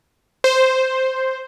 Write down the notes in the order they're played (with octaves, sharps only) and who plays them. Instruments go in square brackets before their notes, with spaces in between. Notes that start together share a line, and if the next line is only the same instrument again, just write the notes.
[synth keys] C5